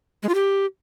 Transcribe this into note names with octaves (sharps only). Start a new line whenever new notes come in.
G#3
F4
G4